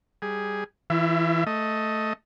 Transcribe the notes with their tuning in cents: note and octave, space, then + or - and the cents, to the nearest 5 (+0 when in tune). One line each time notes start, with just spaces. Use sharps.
G3 +0 G#4 +0
E3 -5 F4 -45 E5 +35
A3 +0 D#5 +10